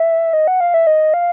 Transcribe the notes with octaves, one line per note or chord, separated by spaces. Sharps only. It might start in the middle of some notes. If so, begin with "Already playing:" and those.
Already playing: E5
D#5
F#5
F5
E5
D#5
F5